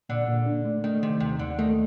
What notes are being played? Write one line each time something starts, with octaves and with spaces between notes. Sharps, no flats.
A#2 D3
A#2
D4
A3
D#3 A3
C3 D#3
D#2 C3
D#2 D3
D#3 A3